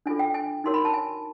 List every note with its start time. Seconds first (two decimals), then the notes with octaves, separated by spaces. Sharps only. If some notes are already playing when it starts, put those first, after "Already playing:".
0.06 D4 F4 A4 G#5
0.19 G5
0.34 G#5
0.64 D#4 F#4 A#4 C#5 C6
0.74 B5
0.85 A5
0.94 G#5